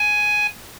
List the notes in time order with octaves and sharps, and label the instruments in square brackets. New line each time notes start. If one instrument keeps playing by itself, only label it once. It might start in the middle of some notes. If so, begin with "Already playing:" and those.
Already playing: [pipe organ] G#5